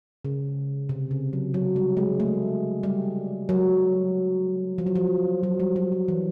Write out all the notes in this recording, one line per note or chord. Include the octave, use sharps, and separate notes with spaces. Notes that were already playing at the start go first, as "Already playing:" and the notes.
C#3
C3
C#3
F#3
F#3
G3
G#3
A3
G3
F#3
F3
F#3
F3
F#3
G3
F#3
F3
E3